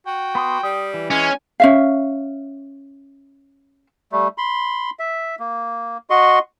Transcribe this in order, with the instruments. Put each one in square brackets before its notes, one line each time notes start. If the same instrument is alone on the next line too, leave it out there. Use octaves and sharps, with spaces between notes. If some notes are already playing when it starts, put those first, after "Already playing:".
[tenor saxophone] F#4 [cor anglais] G5
[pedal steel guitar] B3 C6 D#6
[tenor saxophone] G3 [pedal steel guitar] D#6
[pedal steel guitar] E3
[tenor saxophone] G#3 [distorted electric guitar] C#4 [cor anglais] G#5
[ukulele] C#4 E5 F5
[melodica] G3 A3
B5 C6
E5
A#3
F#4 D#5 C6 C#6